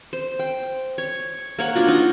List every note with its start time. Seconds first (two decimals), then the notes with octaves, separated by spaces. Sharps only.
0.13 C5
0.39 G5
0.98 C#5
1.59 A#3 C#5 F#5
1.75 D4 F4 F#4
1.88 D#4